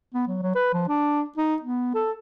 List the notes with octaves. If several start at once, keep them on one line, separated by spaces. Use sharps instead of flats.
B3
F#3
F#3
B4
F3
D4
D#4
B3
A4